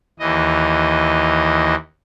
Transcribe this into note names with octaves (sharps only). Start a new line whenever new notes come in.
D#2 E3 D#5